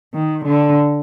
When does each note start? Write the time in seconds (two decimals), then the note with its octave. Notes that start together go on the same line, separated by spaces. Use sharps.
0.14 D#3
0.45 D3